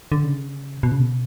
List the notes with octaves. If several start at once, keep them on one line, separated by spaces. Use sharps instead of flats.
D3
C#3
B2
C#3
B2